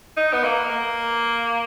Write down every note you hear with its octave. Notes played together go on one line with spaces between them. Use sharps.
D#4
B3
A#3
A#3